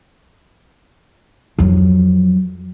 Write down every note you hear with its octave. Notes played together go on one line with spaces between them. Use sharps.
F2 F#3